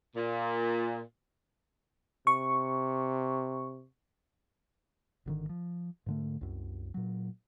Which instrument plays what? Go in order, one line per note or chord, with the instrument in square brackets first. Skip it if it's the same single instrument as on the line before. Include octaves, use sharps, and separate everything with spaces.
[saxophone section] A#2
[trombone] C3 [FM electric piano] C#6
[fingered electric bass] G#1 D3 D#3
F3
G#2 D3 A3
C2 F#2
A#2 F#3